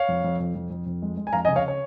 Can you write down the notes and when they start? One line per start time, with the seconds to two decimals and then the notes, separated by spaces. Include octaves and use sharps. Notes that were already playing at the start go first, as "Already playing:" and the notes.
Already playing: C#5 F5
0.08 F2
0.24 F2
0.40 F2
0.55 F2
0.70 F2
0.86 F2
1.02 G#3
1.17 G#3
1.27 G#5
1.33 F2 F5 A#5
1.45 D#5 G#5
1.48 C#3
1.56 C#5 F5
1.68 C#5